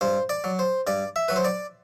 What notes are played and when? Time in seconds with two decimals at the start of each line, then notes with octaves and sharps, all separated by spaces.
0.01 G2 C5
0.29 D5
0.44 F#3
0.59 C5
0.87 G2 D5
1.16 E5
1.28 F#3 B4
1.36 C5
1.45 D5